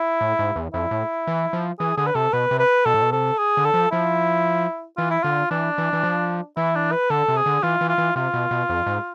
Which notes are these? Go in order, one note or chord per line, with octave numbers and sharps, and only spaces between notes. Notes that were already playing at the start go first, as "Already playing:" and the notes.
Already playing: E4
A2
G#2
E2
F2 E4
A2
E3
F3
E3 G#4
D3 G#4
B4
C3 A4
B2 B4
C3
B4
B2 A4
A2
B2
C3 A4
G#4
D3
A4
F3
F3 E4
E3 F4
E4
D3 F4
E3 D4
E3
E3
F3
E3 E4
D4
B4
D3 A4
C3
G#4
D3
E3 F4
E3
F4
E3
C3 F4
B2
B2
F2
G#2